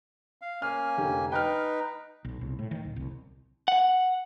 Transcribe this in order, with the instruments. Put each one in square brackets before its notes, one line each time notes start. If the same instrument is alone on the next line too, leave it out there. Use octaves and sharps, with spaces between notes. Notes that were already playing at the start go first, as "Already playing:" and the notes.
[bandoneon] F5
[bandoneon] A#3 C#4 G#5 [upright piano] F6
[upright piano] F1 D3 G4
[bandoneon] D#4 B4 [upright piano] G5 F6
[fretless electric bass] B1
C2
A2
D#3
D1
C2
[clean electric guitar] F#5